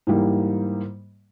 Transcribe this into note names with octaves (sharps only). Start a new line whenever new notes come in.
G#2 E3 G3 A#3